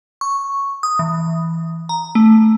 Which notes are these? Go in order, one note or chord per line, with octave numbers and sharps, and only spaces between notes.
C#6
D#6
E3
A#5
A3